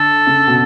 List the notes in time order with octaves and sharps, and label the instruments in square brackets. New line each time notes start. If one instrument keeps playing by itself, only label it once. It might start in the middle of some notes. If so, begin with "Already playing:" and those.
Already playing: [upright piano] D3 [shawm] A4
[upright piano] C#3
B2